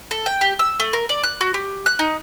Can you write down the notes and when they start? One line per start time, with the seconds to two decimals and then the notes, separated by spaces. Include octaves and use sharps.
0.11 A4
0.26 G5
0.41 G4
0.59 E6
0.80 A3
0.93 A#4
1.09 D5
1.23 F#6
1.41 F#4
1.54 G4
1.86 F#6
1.99 D#4